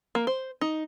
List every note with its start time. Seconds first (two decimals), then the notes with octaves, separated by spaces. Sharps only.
0.15 A#3
0.27 C5
0.61 D#4